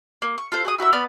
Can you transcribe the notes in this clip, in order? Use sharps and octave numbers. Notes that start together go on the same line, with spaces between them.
A#3
C#6
F4 A4 C5
F#4 G#4 D#6
E4 F#4 A#4 E5
B3 D5 B5 F6